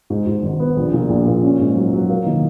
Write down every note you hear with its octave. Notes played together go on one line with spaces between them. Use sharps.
G#2
G#2
G#1
B3
A#1
A#2
A#1
A#2
C#4
G#2
F#3
F#3
A#3
D#3